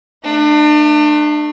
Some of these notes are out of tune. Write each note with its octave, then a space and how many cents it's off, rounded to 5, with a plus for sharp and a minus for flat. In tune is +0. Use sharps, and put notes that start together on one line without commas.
A3 +0 D4 +35